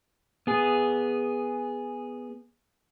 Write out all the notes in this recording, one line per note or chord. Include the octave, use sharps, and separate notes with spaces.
B3 G#4